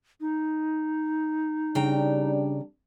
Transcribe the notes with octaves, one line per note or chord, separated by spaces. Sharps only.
D#4
C#3 G3 D4 G5 A#5